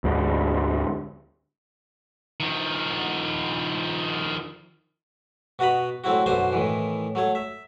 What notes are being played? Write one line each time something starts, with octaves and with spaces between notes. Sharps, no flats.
D2 G#2 D3
D#3 F3
B2 F#4 D#5 A#5 B5
F#3 A3 C4 E4 F#4
F#2 B2 D3 F#4 C5 C6
A2 D#3 E3
F#3 A3 C#5
E5